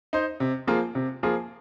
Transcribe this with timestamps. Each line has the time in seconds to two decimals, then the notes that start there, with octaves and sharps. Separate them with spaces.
0.13 D#4 C5
0.40 C3
0.67 F3 A#3 F4 G#4
0.95 C3
1.23 F3 A#3 F4 G#4